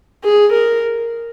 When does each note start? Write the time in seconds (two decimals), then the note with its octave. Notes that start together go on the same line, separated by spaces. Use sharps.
0.24 G#4
0.53 A#4